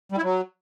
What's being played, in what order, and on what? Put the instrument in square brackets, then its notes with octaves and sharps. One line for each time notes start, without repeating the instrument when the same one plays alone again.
[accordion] G3
E4
F#3